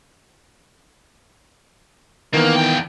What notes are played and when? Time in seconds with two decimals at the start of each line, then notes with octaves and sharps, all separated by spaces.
2.34 D#3 E3 A#3 B3
2.56 E2 G5